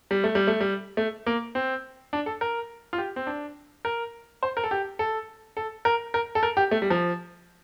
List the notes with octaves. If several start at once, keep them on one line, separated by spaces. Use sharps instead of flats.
G3
A3
G3
A3
G3
A3
A#3
C4
D4
A4
A#4
F4
G4
C4
D4
A#4
C5
A#4
A4
G4
A4
A4
A#4
A#4
A4
A#4
G4
A3
G3
F3